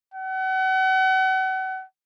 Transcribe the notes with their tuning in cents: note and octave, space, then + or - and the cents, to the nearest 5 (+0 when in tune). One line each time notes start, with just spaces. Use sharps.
F#5 +35